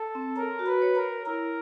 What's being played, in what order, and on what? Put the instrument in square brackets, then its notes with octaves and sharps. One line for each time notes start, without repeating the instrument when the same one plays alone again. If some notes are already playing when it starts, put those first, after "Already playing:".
Already playing: [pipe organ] A4
[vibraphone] C4
[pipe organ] A#4 [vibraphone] C#5
[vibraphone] F#4
[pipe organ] B4
[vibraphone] C#5
[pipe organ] A#4
[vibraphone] C#5
[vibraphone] E4 [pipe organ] A#4